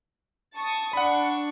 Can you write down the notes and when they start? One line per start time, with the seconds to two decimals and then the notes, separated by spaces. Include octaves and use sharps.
0.54 A5 C#6 D#6
0.93 D4 F#5 B5 C#6